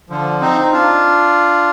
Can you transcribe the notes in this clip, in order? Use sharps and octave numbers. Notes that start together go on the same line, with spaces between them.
D3 F3
C4 D#4
D#4
D4 F4